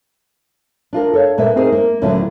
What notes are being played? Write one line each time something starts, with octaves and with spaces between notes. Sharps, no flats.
D4 F4 A#4
A4 C#5 F5
A#2 A#3 B4 E5
C4 D#4 G#4 A#4 C5
A#3
D2 A#2 D3 F#3 C#4 E4